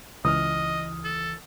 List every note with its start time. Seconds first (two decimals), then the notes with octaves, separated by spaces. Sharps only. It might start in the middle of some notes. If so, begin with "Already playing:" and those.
0.25 C#2 E3 D#5 D#6 F6
1.04 A4